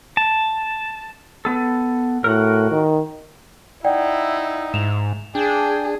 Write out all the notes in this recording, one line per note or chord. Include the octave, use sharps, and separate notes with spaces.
A5
B3 A4
A2 F#4 A#4
D#3
D#4 E4 D5 F#5 G5
G#2 E7 F7
D4 G#4 G5